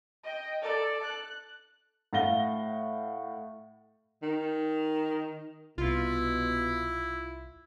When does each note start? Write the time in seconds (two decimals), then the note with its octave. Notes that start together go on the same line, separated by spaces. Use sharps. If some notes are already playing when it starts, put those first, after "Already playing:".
0.24 D#5 G5
0.62 A4 D5
1.04 F#6
2.13 A2 F5 F#5 A#6 G7
4.23 D#3
5.78 C2 B2 E4 F4